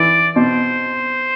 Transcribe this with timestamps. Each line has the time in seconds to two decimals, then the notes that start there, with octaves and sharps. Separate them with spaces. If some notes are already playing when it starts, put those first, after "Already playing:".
Already playing: E3 D5
0.36 B2 C5